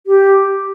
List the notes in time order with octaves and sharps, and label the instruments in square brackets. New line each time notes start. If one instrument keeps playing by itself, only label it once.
[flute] G4